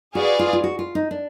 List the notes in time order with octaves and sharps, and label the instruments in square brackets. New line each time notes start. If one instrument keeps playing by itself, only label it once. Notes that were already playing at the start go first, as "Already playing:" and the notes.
[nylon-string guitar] F#4 [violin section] G#4 B4 D5 F5
[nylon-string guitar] F4
F4
F#4
F4
D#4
D4